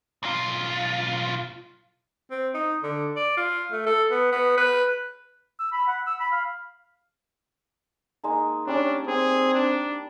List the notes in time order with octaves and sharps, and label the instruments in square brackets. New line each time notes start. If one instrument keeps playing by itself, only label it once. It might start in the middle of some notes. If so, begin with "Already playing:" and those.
[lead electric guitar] B1 F4
[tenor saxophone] C4
D#4
D3
D5
F4
A3
A4
B3
B3
B4
[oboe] E6
B5
F#5
E6
B5
F5
[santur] G#3 A#3 D#4
[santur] G3 F#5 [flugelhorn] C#4 [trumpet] D4
[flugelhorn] C4 [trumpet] G#4
[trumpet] D4